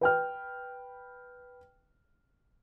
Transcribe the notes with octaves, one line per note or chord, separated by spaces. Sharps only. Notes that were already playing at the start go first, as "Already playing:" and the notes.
B4 G5 F6